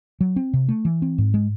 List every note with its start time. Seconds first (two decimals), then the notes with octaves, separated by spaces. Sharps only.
0.21 F#3
0.36 C4
0.53 C3
0.69 A3
0.85 E3
1.02 C4
1.18 G#2
1.34 G#3